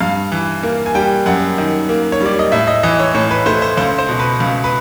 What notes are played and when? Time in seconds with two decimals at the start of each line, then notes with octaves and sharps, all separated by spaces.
0.01 G2 F5
0.32 E3
0.63 A#3
0.86 G#5
0.95 G3 G5
1.26 F#2 F#5
1.58 D#3
1.89 A#3
2.12 C#5
2.21 G3 D5
2.39 D#5
2.52 A2 E5
2.67 D#5
2.83 E3 D#5
2.99 C#5
3.14 A2 C#5
3.31 B4
3.46 A3 C5
3.62 C5
3.77 C#2 C5
3.99 C5
4.09 B2
4.19 B4
4.40 C#2
4.64 B4